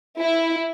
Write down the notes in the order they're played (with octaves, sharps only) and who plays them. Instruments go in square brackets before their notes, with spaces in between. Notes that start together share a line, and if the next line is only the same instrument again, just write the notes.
[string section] E4